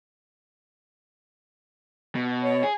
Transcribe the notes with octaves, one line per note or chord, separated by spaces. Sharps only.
B2
C#5
G#4